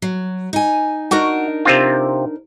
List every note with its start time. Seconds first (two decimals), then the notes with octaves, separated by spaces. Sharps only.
0.02 F#3
0.53 D#4 G#5
1.11 D4 D#4 F#4 A#4
1.65 C3 C4 F4